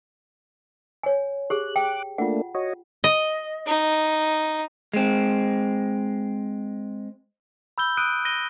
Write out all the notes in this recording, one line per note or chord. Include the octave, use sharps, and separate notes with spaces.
C#5 G#5
G4 G#4 F#6
G5 D6 F#6
A3 A#3 D4 F4 F#5
F#4 C#5 D#5
D#5
D#4
G#3 C4
B5 E6 G6 G7
D#6 F#6 D7 D#7
A#6 D#7 G7